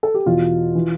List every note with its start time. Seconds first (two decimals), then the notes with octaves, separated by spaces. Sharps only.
0.03 A4
0.15 G4
0.26 E2 B2 F4
0.75 E3